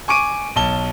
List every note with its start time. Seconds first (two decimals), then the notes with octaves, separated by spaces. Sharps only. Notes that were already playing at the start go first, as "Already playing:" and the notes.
0.08 G#5 C#6 D6 D7 D#7
0.56 B1 A5 G7